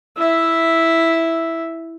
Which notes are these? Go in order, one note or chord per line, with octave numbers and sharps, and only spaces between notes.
E4 E5